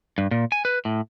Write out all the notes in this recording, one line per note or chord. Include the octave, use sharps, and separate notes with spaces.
G2
A#2
G#5
B4
A2